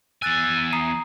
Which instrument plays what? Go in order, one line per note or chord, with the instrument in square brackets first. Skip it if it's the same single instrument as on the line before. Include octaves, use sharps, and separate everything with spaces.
[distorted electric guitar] E2 G#5 [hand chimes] E6 F#6 A6
[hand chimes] A#5 D#6 C7